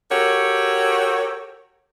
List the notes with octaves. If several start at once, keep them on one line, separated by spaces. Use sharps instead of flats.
F#4 G4 A4 A#4 C#5